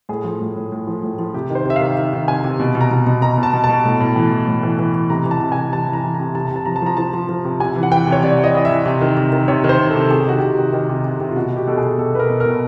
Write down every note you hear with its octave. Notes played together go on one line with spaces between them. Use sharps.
A2 G#4
F3
A2
A2
A2
F3
A2
F3
C3 G4
D#3
C5
C3 E5
F5
D#3
D#3 E5
D#3
C3 G#5
C3
B2
B2
A#5
B2
B2
B2 A#5
B2
A5
B2
A5
B2
A2
A2
E3
E3
A2
E3
E3
E3
C3 A#5
E3
A5
C3
G#5
C3
E3 A5
E3
A#5
E3
A#5
C3
C3 A5
A#5
C3 A5
F3 A#5
A5
F3 A#5
F3 A5
F3
F3
C3
C3 G#5
E3
F#5
E3 G5
C3 C#5
C3 D5
E3
D#5
E3 D#5
E5
E3
C3
D#3
C3
D#3
C3 C#5
D#3
C5
C3
A4
C3
C3 G#4
G4
D#3 F#4
C3 G4
D#3
D#3
C3
C3
C3
F4
B2 F#4
B2
G4
B2 A4
G#4
B2
B2 A4
B2 B4
A#4
B2
A#4
B2